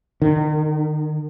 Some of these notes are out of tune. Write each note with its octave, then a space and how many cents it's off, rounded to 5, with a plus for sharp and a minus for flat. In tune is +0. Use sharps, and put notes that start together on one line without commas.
D#3 -35